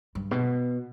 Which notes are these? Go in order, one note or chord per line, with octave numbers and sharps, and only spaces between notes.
G2
B2